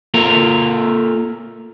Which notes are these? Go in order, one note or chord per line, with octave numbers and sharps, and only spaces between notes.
A#3 F4 A4 A#5